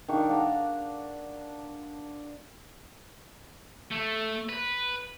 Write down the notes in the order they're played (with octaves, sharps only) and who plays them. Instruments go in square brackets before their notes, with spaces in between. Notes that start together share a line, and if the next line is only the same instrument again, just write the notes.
[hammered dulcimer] D#3 D4 F5 C#6
D5 F#5 A5 A#5
[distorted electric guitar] A3
B4